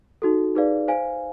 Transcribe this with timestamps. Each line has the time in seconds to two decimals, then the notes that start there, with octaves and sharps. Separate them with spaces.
0.22 D#4 F#4 A4
0.55 D#4 G#4 B4 D5 F5
0.88 C5 F5 G#5